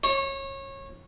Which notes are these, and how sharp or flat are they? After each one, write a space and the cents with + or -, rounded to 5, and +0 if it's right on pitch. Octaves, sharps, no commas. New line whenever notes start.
C#5 -25